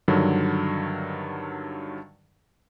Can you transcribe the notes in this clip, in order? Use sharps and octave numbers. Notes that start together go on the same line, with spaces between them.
G2 D3 D#3 F#3